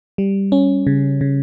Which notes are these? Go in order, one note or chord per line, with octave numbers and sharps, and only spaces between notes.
G3
C#4
C#3
C#3